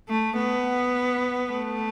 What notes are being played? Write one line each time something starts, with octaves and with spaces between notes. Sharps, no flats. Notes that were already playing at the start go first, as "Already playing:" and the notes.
A3
B3
A3